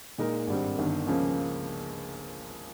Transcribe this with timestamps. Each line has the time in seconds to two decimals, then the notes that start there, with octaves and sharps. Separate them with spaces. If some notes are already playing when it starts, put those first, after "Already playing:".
0.18 A#2 G#3 D#4 A#4
0.47 G#1 G2 G3 C4
0.77 G1 G2 D#3
1.07 C#2 C#3 F3 A#3 C#4